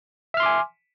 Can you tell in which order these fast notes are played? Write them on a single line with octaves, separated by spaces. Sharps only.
E5 F6 C6 D6 G#5